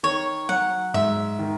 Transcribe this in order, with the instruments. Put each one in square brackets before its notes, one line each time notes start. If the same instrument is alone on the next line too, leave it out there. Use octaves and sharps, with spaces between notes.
[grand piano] D#3 [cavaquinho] C#5
[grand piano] F#3 [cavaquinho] F#5
[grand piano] G#2 [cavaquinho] E5
[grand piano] D#3